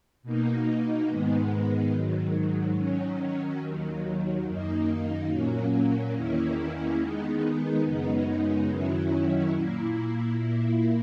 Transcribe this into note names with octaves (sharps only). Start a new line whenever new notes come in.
B2 A#3 D#4
G#2 D#3 G#3 B3
G#2 D#3 F#3
D#3 F#3 C#4
D#2 D#3 F#3
F#2 D#3 A#3 D#4
A#2 F#3 A#3 C#4
E2 D#3 A#3 C#4 E4
D#3 G#3 B3 D#4
F#2 C#3 G#3 B3 D#4
F#2 D#3 F#3 C#4 E4
A#2 A#3 E4
A#2 A#3 E4